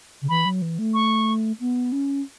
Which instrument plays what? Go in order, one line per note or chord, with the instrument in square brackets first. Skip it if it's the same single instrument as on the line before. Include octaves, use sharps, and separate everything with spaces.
[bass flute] C#3
[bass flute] E3 [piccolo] B5
[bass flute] F#3
E3
A3
[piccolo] C#6
[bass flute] B3
C#4